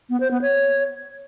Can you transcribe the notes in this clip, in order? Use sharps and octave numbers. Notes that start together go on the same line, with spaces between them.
B3
C5
B3
C#5